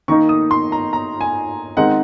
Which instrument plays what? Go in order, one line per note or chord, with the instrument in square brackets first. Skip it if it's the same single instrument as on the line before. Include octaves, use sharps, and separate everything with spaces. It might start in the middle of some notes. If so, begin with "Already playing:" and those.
[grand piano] D#3 A#3 D#4 [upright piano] C#6
[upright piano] D#6
C6
A#5
A#5
G#5
[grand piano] D#3 G#3 C4 D#4 [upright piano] F#5